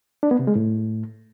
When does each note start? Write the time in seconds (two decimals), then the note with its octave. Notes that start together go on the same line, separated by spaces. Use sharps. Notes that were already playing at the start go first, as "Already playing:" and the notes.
0.23 D4
0.31 B3
0.39 C3
0.47 G#3
0.55 A2